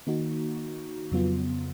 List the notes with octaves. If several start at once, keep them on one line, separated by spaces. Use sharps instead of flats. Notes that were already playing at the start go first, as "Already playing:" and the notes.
D#3 A#3 D#4 F#4
F2 C#3 F#3 B3 F4